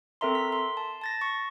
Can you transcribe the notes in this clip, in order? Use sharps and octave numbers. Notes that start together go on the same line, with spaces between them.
C4 A4 A#4 E5 A#5 C6
B6
C6
A5
A5 A6 A#6
C#6